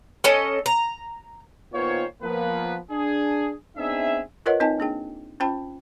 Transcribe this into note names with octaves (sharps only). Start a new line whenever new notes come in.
C#4 A4 D#5
A#5
A#2 D#3 B3 F4 C5 C#5
F3 A#3 B3 B4
D4 G#4
B3 C4 D4 D#4 G#4 E5
F4 A#4 B4 C#5 D#5 F#5
C4 D#4 D#5 G#5 A5
A#3 D4 G#4 G5
C#4 F4 C5 G5 A5 B5